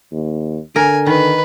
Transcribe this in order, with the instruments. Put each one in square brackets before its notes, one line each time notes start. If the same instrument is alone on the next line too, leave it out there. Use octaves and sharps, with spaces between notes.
[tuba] D#2
[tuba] D3 [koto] A#4 [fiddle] G#5
[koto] D#3 [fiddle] B4